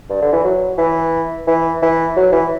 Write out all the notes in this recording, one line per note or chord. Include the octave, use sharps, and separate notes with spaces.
G2
D3
E3
F#3
E3
E3
E3
F#3
E3